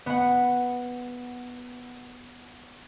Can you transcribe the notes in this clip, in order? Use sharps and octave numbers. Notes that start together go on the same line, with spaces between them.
B3 F#5